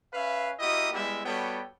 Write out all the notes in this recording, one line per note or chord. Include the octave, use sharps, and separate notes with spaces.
C#4 B4 E5 F5
A#3 E4 F#4 G4 D#5 D#6
G3 G#3 B3 E4 G4 E5
G3 B3 F#4 A4 C#5 G5